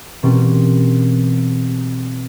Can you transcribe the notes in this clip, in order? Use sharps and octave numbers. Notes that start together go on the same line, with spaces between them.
B2 E3 G3 A#3 C4 C#4